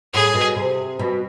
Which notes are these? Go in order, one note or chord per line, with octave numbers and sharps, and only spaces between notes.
A2 G#4
B2
C3
B2